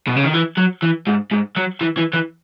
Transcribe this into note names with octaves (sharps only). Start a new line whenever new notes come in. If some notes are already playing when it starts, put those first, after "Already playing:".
B2
C#3
D#3
E3
F#3
E3
G#2
G#2
F#3
E3
E3
E3